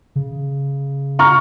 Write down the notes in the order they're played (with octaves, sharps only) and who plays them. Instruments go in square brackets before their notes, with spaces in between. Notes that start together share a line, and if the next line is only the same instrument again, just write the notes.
[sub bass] C#3
[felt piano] A#5 C#6 F6